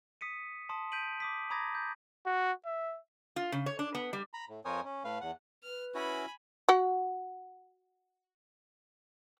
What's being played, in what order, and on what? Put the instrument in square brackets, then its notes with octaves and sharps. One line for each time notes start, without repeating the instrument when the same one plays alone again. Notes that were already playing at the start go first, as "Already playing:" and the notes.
[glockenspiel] D#6 B6 C#7 D#7
A5 C6 D#6
G6 B6 D7 D#7 F#7
D6 D#6 B6
A#5 B5 D6 D#6 G#6 A#6
G6
[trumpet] F#4
E5
[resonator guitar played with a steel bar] F4
C#3
C#5
D4
B3
G3
[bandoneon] A#5 B5
A2
F2 A#4 C5 C#5 G#5 D#6
C#4
A2 A3 B4 F5
E2 F#5
[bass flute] B4 [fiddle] F6
[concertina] C#4 E4 F#4 [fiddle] G#5 B5
[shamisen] F#4 F#5